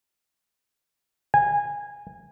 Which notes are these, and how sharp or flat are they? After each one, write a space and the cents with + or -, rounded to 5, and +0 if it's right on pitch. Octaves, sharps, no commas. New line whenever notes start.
G#5 -15